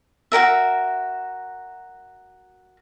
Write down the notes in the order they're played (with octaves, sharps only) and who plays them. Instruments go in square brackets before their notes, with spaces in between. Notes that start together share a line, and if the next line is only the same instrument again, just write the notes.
[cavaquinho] F#4 G4 A#4 E5